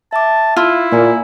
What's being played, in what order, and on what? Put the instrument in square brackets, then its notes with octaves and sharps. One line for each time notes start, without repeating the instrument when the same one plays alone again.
[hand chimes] E5 D6 [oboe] A5
[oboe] E4 [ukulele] F4
[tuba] A#2 [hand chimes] A#3 G#5 A#5